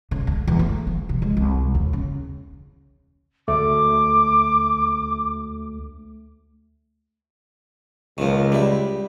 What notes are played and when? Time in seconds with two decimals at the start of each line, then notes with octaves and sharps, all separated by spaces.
0.11 C#3
0.27 D2
0.47 E2
0.59 A3
0.87 F3
1.09 C3
1.22 G#3
1.37 C2
1.75 D#2
1.93 C#3
3.48 D2 A3 D6
8.18 C#2 D#3 F3
8.52 G3 E4